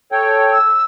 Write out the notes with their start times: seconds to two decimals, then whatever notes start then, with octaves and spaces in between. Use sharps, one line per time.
0.12 A4 C#5 G5
0.52 E6